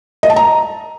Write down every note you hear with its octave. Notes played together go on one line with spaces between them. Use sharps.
D#5
A5
A#5